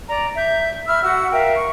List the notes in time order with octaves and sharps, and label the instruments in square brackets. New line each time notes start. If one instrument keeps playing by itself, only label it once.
[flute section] D5 A#5
E5 G6
E5 B5 E6 F6
F#4 F#5 E6
A#4 E5 F5 G5
C#6